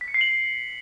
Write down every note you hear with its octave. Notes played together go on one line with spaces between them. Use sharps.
B6
C#7
C7
F#7